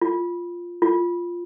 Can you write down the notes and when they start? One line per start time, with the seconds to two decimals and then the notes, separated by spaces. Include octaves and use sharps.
0.02 F4
0.82 F4